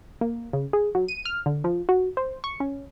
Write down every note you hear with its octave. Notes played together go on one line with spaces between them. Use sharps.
A#3
C#3
G#4
F#3
D#7
F6
D3
F3
F#4
C5
C#6
C#4